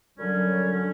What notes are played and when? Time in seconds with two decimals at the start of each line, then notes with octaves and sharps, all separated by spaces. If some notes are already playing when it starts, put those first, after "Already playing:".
0.18 F#2 D3 F#3 G3 C#4
0.72 D3 G3 C#4